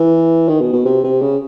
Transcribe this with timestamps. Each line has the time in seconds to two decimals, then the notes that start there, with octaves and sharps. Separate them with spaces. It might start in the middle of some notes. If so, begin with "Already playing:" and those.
Already playing: E3
0.48 D#3
0.61 B2
0.73 B2
0.85 C3
1.04 C3
1.22 C#3